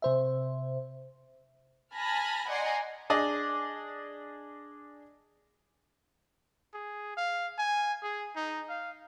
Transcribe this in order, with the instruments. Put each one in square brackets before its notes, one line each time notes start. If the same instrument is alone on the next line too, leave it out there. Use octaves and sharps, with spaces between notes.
[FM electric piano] C3 C5 E5
[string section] G#5 A5 B5 F6 A#6
D5 D#5 F#5 G#5 A#5 C6
[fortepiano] D4 G#4 D5 D#5
[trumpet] G#4
F5
G#5
G#4
D#4
F5